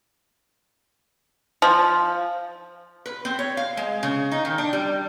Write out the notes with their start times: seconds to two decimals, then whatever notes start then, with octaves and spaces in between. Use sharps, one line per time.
1.62 F3
3.06 B4
3.25 C4
3.39 C#5
3.57 F5
3.77 G#3
4.03 C#3
4.31 D#4
4.45 D#3
4.58 D4
4.73 G3